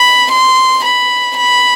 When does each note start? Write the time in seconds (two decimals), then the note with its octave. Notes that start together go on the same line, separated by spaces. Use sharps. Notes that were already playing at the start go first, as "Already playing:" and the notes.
Already playing: B5
0.31 C6
0.84 B5
1.37 B5